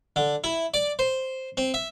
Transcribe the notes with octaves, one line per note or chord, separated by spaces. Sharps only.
D3
E4
D5
C5
C4
E5